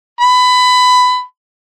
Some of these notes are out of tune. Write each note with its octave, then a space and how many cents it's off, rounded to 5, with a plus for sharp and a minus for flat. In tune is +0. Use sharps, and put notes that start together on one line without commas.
B5 +20